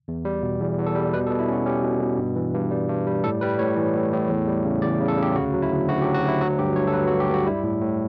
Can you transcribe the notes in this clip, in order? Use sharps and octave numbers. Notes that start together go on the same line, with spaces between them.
E2
G3
B2
E2
E2
A4
G3
B2 B4
A4
B2
E4
C#4 F#4
C#4 G4
B2
B2
G2
E3
G2
G3
G2
G3
A2 A4
G3 B4
A2 C#5
E3
A2
A2
E2
G3
C#3
E2 D5
C#3
A4
C#3
G4
D2 F#4
F#3
E4
D2
D2 F#4
G4
F#3
F#4
D2 E4
F#3 F#4
G2 G4
G2 C#5
A4
F#3 B4
F#4
G2
G4
G2 F#4
G3 E4
A2
A2